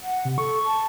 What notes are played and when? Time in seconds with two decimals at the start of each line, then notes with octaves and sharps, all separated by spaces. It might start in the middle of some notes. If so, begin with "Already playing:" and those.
0.01 F#5
0.25 C3
0.38 A4 C#6
0.64 A5